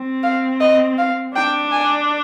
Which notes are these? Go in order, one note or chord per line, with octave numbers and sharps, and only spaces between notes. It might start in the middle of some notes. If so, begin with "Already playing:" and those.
Already playing: C4
F5
D#5
F5
D4 G5
G#5